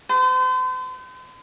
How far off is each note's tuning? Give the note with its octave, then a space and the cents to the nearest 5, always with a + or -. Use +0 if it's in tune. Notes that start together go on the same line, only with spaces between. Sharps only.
C5 -40